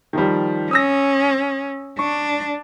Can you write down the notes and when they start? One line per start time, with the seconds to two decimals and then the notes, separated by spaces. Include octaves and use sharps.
0.13 D#3 F3 G3
0.71 C#4 D#6 E6 A#6
1.99 D4 C#6